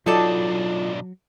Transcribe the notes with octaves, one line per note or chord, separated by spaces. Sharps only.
B1 F#3 D4 D#4 F4 A4 D5